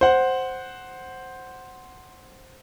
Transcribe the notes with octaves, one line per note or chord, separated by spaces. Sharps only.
C5 F#5